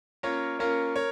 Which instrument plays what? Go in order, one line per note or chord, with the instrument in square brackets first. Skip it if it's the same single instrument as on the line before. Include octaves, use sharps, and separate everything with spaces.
[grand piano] A#3 C#4 F4 A#4 C#5
A#3 C#4 F4 A#4 C#5
A#4 C#5